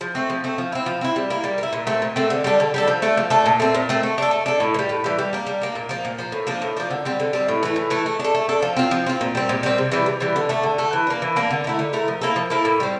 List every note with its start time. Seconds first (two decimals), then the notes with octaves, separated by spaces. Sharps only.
0.01 F3
0.15 A3 C4
0.30 F3
0.44 A3 C4
0.58 F3
0.72 C4 E4
0.86 F3
1.01 C4 E4
1.16 G3
1.30 A#3 E4
1.44 G3
1.58 A#3 E4
1.73 A#2
1.87 A3 C4
2.02 A#2
2.16 A3 C4
2.30 D3
2.44 G3 D4 A4
2.60 D3
2.74 G3 D4 A4
2.88 F3
3.02 A3 D4 A4
3.17 F3
3.30 A3 D4 A4
3.46 A#2
3.60 A3 C4
3.75 A#2
3.89 A3 C4
4.03 A3
4.18 D4 A4
4.31 A3
4.46 D4 A4
4.60 A2
4.74 E3
4.79 G3
4.89 A2
5.04 E3 G3
5.18 G3
5.33 A#3 D4
5.47 G3
5.61 A#3 D4
5.75 A#2
5.89 F3 A#3
6.05 A#2
6.18 F3 A#3
6.32 A2
6.47 F3 A#3 D4
6.62 A2
6.77 F3 A#3 D4
6.91 D3
7.05 G3 C4
7.20 D3
7.33 G3 C4
7.48 A2
7.63 E3 A3
7.76 A2
7.90 E3 A3
8.06 A3
8.19 D4 A4
8.35 A3
8.49 D4 A4
8.62 F3
8.77 C4 F4
8.91 F3
9.06 C4 F4
9.21 A#2
9.35 G3 C4
9.49 A#2
9.63 G3 C4
9.78 C3
9.91 E3 G3
10.06 C3
10.20 E3 G3
10.36 D3
10.49 A3 D4
10.63 D3
10.78 A3 D4
10.93 E3
11.07 A#3 D4
11.22 E3
11.36 A#3 D4
11.51 D3
11.64 A3 E4 A#4
11.79 D3
11.93 A3 E4 A#4
12.08 F3
12.21 A#3 E4 A4
12.36 F3
12.50 A#3 E4 A4
12.65 A2
12.80 G3 C4